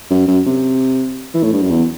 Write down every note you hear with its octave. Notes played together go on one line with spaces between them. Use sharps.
F#2
F#2
C3
E3
A2
G2
F#2
E2